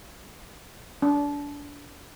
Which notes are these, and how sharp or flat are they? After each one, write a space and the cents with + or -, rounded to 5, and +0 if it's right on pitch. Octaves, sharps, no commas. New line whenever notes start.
D4 -25